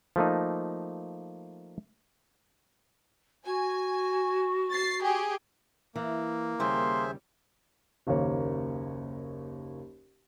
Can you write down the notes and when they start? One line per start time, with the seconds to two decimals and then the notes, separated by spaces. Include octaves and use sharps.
0.16 F3 A3 A#3 D#4
3.46 F#4 G#5
4.70 A6 C7
5.02 G4 G#4
5.96 E3 A#3
6.60 D#2 C#3 G3 G#4 C5 E5 C6
8.07 F#1 D#2 A#3 C#5